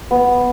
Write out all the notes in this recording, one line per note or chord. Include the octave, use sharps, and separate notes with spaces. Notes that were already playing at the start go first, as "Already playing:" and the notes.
B3